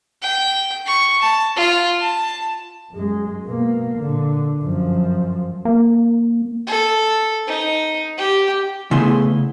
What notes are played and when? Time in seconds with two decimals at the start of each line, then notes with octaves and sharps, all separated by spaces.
0.22 G5
0.86 C#6
1.22 A5
1.56 F4
2.01 A5
2.91 F#2 G#3
3.45 B2 A#3
3.99 A#2 D3
4.61 F#2 F3
5.65 A#3
6.67 A4
7.47 D#4
8.18 G4
8.91 C#3 A3 B3 E4 G#4 C6